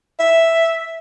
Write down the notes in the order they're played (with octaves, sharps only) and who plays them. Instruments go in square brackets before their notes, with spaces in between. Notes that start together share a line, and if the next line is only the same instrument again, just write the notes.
[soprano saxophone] E5